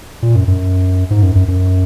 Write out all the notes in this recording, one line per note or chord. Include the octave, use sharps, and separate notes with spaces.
A#2
F#2
F#2
G#2
F#2
F#2
F#2